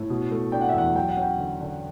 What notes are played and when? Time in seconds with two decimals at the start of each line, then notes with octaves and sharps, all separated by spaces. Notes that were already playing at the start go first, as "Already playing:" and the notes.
Already playing: A2
0.10 B2
0.31 A3
0.52 D4 G5
0.61 F#5
0.69 E5
0.74 E2 F#5
0.95 F#3 G5
1.09 F#5
1.17 C#4 G5
1.38 D3
1.61 D3